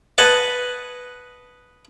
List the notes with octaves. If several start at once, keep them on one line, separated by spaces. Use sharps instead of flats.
B4 D#5 F#5 G#5 A5